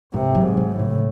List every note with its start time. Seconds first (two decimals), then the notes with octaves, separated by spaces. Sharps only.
0.13 G#2 C3
0.35 F#3
0.43 G#2
0.57 D#3
0.71 A2
0.79 C#3